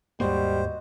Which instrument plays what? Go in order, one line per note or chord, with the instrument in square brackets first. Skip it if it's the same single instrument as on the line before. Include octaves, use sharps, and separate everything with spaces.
[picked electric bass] D#2 G#2 A#3 [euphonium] G3 [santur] F#4 D#5 [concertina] C5